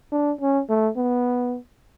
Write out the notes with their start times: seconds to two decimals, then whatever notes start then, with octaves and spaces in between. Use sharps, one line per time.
0.12 D4
0.41 C#4
0.69 A3
0.97 B3